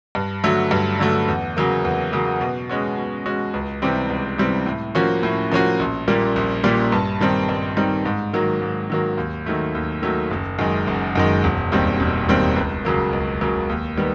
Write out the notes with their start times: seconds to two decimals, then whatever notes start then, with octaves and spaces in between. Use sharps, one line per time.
0.15 G2
0.44 D3 F#3 A3
0.71 G2
0.99 D3 F#3 A3
1.28 E2
1.57 C#3 F#3 A#3
1.85 E2
2.13 C#3 F#3 A#3
2.41 B2
2.69 G#3 C#4 F#4
2.97 B2
3.26 G#3 C#4 F#4
3.54 C#2
3.82 C3 E3 G3 C4
4.10 C#2
4.38 C3 E3 G3 C4
4.66 A2
4.95 F3 A#3 C#4 F#4
5.23 A2
5.52 F3 A#3 C#4 F#4
5.79 A#1
6.08 A#2 G3 A#3
6.36 A#1
6.64 A#2 G3 A#3
6.92 G2
7.21 D#3 G3 C4 D#4
7.49 G2
7.77 D#3 G3 C4 D#4
8.05 G#2
8.33 D#3 F#3 A#3
8.62 G#2
8.90 D#3 F#3 A#3
9.18 D#2
9.46 D#3 F#3 A3
9.75 D#2
10.02 D#3 F#3 A3
10.31 F#1
10.59 F#2 D#3 G#3
10.87 F#1
11.16 F#2 D#3 G#3
11.44 E1
11.72 D#2 D#3 G3 C4
12.00 E1
12.29 D#2 D#3 G3 C4
12.56 C#2
12.85 C#3 F#3 A#3
13.13 C#2
13.41 C#3 F#3 A#3
13.69 D#2
13.97 D#3 G3 B3